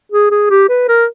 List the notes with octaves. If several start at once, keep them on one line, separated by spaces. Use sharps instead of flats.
G#4
G#4
G4
B4
A#4